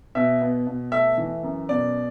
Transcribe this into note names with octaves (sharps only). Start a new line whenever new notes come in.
B2 E5
B3
B2
A3 E5
E3
F#2
B2 D5